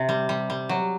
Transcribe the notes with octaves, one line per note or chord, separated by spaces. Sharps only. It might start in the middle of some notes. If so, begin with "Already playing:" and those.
Already playing: C3
G3
G3
G3
F#3